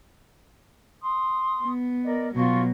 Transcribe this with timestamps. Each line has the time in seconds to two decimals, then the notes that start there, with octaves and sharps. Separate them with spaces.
1.02 C6 D#6
1.63 B3
2.04 A#4 D5 D#5
2.35 B2 F#3 F4 C#6